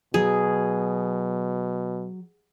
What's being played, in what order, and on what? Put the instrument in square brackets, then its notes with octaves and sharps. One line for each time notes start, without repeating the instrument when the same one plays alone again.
[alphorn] B2 [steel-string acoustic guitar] F#3 [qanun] G#4